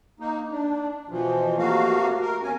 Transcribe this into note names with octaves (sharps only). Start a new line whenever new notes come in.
A#3 D#4
D4
B2 E3 F3
C3 A3 A#3 F#4 F5
A#4
E2 C#4 G#5